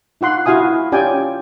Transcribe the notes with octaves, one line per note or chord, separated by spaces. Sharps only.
D#4 F4 F#5 C6
E4 F#4 F5 G#5 D#6
C#4 F4 G4 D5 G5 G#5